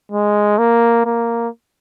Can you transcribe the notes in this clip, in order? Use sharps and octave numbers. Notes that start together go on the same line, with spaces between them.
G#3
A#3
A#3